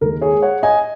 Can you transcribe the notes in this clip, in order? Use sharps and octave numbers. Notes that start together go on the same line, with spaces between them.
D#2 D#3 G#3 A#4
G#4 C#5
C#5 F#5
D#5 G#5